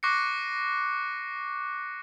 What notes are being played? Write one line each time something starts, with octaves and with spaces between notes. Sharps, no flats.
C#6 D6 F#6 A#6 C7 C#7